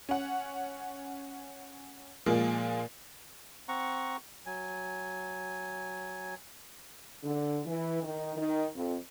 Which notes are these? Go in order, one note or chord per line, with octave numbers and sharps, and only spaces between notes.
C#4 F#5
A#2 F3 G#3 A#3
C4 F#5 A#5 C#6
F#3 G#5
D3
E3
D#3
D#3
F2